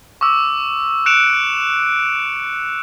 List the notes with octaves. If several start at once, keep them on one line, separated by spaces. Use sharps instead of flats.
C#6 D6 E6
F#6 C#7 D7 E7 F7